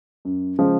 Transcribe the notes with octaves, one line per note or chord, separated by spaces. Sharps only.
F#2
C#3 F3 G#3